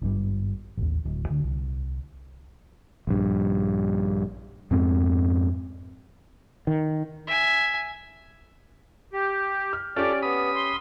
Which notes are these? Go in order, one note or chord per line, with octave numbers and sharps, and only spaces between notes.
G#1 G2 C#3 G3
A1 D#2
D1
D2 D3
C2
A#1 G2
F2 G#2 C4
D#3
E5 G#5
G4
F6
C#4 F4 G4 A4 D5
B3 B5 D#6
C6